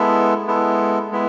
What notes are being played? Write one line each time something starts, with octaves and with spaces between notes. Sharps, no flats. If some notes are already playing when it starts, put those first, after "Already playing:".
Already playing: G#3 B3 E4 A4
G#3 B3 E4 A4
G#3 B3 E4